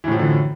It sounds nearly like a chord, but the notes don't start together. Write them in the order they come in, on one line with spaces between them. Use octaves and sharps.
E3 A2 F3 F#2 D3